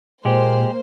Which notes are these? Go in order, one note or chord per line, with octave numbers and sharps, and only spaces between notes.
A#2 G#3 A#3 G4 C5